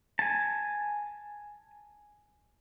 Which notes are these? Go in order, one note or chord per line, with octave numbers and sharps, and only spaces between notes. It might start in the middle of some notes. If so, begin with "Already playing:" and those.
G#5 A5